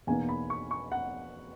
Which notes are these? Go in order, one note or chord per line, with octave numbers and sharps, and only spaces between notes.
E2 B2 A#3 D#4 G#5
B5
C#6
C#6
F#5